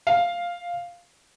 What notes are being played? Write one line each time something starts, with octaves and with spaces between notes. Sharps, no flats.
F5